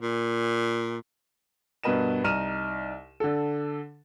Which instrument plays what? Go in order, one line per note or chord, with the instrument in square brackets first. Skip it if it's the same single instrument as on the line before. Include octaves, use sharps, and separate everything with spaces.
[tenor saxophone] A#2
[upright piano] G2 B2 A#4 B4 D#5 E7
C2 D#4 A#5 F6 D#7 E7
D3 A4